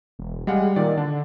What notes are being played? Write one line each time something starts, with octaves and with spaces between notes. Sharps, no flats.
E1
G3 G#3 F5 F#5
A#2 D#3 D5
D3 D4